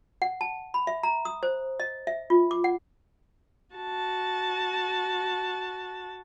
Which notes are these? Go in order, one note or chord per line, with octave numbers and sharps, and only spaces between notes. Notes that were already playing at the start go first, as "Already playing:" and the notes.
F#5
A5
B5
E5
A#5
D#6
C5
D#5
E5
F4
D6
F#5
F#4 A5